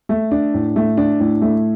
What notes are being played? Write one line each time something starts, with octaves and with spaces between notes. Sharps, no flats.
A3
D4
A2
A3
D4
A2
A3